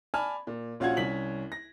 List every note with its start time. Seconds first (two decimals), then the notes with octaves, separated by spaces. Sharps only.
0.14 D5 G#5 A5 B5 F6
0.47 A#2
0.80 A#1 C#4 F4 F#4 F#5 G#6
0.97 C2 C#4 B6 F#7
1.52 A#6